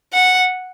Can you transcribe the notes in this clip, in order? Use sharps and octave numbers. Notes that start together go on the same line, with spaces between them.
F#5